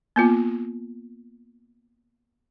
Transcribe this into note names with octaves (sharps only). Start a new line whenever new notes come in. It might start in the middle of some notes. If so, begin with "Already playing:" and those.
A#3 B3 F4